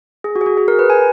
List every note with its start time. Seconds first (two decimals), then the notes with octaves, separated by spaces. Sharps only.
0.24 G#4
0.36 F#4
0.41 G#4
0.46 F#4
0.57 G#4
0.68 A#4
0.79 B4
0.90 G#5